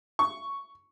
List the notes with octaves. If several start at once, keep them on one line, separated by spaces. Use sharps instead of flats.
C#6